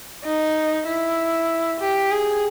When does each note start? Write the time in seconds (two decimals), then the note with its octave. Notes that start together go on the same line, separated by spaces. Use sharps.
0.25 D#4
0.86 E4
1.80 G4
2.11 G#4